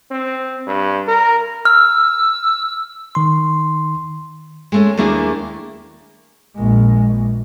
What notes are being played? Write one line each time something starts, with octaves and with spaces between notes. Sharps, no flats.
C4
G2
A#4
E6 F6
D#3 C6
G#3 A3 C#4
D#2 A3 A#3 D4 E4 G#4
A#1 G#3